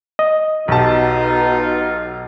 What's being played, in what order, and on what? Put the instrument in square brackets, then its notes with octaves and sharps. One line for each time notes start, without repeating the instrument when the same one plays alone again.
[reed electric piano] D#5
[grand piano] B1 G4 A5 [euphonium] B2 [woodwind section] D#4 F4